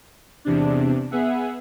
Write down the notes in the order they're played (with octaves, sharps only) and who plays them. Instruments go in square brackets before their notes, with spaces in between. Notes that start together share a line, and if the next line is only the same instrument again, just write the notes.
[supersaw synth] E2 C3 D4
B3 G#4 E5 F#5